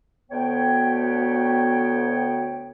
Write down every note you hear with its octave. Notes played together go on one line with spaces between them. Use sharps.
D2 B3 C#5 G5